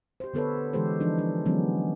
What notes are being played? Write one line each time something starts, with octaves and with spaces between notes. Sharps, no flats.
G4 C5
D3 B3 A4 B4 C#5
D3 E3 G#3 G4 A4 C5
E3 F3 D4 D#4
D4
D3 E3 F#3 G#3 B3 C#4